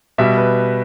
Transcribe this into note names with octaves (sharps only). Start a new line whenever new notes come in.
B2 G3 E5
B4